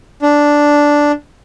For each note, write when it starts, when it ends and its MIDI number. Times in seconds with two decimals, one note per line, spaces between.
0.22 1.12 62